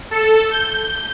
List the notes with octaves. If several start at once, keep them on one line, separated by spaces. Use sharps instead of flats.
A4
G6